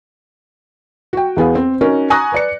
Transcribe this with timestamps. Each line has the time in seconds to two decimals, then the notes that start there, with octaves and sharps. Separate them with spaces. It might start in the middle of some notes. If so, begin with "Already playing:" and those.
1.13 F#4 G5
1.37 E2 B3 G#4 F5
1.55 C4
1.81 C#4 D#4 F#4 A#4
2.10 G#5 A#5 C#6 D#6 F#6 A#6
2.32 B4 D5 C#7